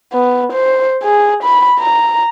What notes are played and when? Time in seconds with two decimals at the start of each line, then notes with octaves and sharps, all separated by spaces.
0.13 B3
0.52 C5
1.03 G#4
1.43 B5
1.80 A#5